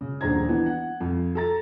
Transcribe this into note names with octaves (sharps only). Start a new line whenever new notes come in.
C#3
D#1 A#1 C5 A#5 G#6
E3 B3 D4
F#5
F2 F4
A4 A#5 A6